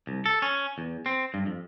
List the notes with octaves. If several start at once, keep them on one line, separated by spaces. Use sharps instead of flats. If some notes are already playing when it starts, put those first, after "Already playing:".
C2
A4
C#4
E2
C4
G2
F2